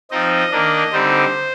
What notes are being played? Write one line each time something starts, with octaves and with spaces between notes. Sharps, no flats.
F3 C4 D#4 D#5
D#3 A#3 D4
D3 G3 C4 D#4 C5